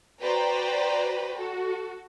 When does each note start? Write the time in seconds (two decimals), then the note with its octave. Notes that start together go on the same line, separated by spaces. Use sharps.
0.22 F#4 B4 C5 D5 G5 A#5
1.36 F#4 A4